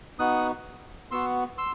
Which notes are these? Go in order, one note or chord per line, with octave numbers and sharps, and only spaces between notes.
B3 D#4 F#4 D#6 F#6
B3 F#4 C6 E6
C6 E6